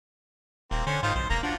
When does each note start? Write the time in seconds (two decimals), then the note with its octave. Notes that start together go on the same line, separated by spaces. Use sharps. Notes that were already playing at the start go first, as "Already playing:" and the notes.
0.71 D#1 A#3 C4
0.87 D3 C#4 C5
1.03 G#2 D#3 F4 C5
1.15 B1 C5
1.30 E1 A#3 A#5
1.43 F3 D4 F#4